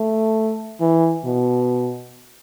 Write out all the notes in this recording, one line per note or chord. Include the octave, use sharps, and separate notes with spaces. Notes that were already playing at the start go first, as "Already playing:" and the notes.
Already playing: A3
E3
B2